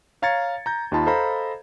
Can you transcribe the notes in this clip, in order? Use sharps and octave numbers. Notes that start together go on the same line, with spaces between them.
C#5 F5 A#5 G#6 A6 C#7
A#5 G6
D#2 D#4 F4 A5 B5
A4 C5 D#5 F5 A#5 B5